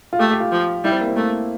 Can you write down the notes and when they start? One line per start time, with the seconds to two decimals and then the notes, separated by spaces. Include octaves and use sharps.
0.13 F4
0.19 A3 G4
0.30 G4
0.40 F4
0.52 F3
0.84 G3 E4
0.92 C4
1.00 A#3
1.08 C4
1.16 A3 A#3